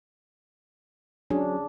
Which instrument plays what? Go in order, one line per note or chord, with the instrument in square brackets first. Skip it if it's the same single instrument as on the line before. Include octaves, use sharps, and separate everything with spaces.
[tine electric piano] F#3 C#4 G#4 [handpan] D4